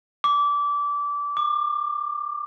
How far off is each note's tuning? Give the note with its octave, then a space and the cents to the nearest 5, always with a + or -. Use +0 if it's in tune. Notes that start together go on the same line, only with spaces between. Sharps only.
D6 -20
D6 +30